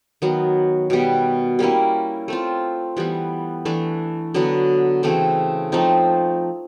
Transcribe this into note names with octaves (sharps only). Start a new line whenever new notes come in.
D#3 F#3 B3
B2 G3 B3
G3 A#3 C#4 E4
A3 C4 F4
E3 G3 B3
E3 A3 D4
D3 F#3 B3
C#3 E3 A3 C4
F3 A3 C4 D#4